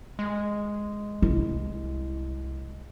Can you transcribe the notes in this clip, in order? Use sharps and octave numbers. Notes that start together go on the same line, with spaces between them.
G#3
C2 E4